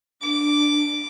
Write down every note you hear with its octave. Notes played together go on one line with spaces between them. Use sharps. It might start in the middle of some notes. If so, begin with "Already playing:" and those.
D4 D6